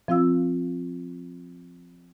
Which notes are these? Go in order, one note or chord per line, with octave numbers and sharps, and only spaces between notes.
F3 C4 F4 F5 E6